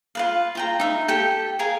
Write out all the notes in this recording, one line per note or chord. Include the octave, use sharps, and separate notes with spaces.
F4 B4 F5
F4 G5 A#5
D#4 E5
G4 A4 G5
G#4 A#4 F5 G#5